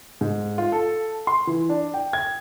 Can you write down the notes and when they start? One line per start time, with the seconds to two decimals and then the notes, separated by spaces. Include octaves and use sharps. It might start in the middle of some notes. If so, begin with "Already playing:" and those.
0.21 G#2
0.58 F4
0.72 A4
1.27 C6
1.47 E3
1.69 D4
1.94 G5
2.13 G#6